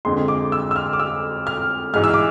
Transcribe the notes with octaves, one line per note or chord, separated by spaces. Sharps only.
F2 D3 G#3 C6
D6
E6
E6
F6
D6
E6
F6
G#2 E3 G#3 F6
E6
D6